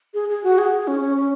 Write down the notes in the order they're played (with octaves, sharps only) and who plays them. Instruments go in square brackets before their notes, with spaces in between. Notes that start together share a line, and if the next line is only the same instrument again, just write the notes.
[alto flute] G#4
G#4
F#4
G#4
G#4
C#4
C#4
C#4